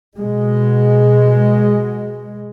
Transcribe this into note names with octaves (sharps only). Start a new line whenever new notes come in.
B2 G#3